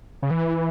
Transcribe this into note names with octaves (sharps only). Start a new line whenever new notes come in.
C#3
E3